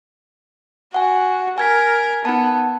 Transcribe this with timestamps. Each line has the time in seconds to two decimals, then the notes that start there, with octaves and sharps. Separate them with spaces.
0.94 F#4 F#5 G#5
1.58 A#4 G#5 G#6 B6
2.25 B3 D#4 A5